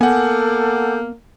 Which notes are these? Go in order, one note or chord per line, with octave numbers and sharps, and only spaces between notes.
A#3 B3 A4 F#5 G#5 D6 G6